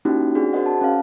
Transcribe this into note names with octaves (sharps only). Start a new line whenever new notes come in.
A#3 C#4 D#4 E4 F#4 G4
C4 D4 F#4 G#4
F#4 G#4 A#4 C5 D#5 F#5
A5
C#4 A#4 F5